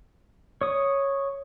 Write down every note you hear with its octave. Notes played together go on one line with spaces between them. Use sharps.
C#5 D#6